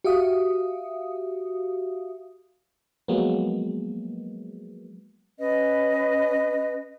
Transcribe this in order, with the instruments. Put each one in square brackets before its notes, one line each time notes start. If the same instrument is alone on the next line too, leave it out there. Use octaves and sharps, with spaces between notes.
[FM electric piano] F#4 G4 E5 F5 D#6
F3 F#3 G#3 A#3 B3
[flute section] C#4 B4 D#5